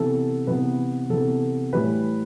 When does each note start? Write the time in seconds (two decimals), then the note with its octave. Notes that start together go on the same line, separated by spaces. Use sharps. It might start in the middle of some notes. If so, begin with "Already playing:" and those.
Already playing: C3 E3 B3 A4
0.47 C3 E3 B3 B4
1.10 C3 E3 B3 A4
1.73 A2 E3 G3 B4